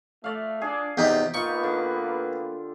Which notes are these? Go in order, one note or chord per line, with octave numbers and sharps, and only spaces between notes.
A3 D5 F5
D4 G#4
E2 C3 D#4 G4
A#3 B3 D#4 F4 B4 D5 C#6
D3